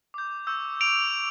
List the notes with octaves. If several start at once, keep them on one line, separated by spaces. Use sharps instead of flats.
D6 G6
C#6 E6 G6
D6 D7 F7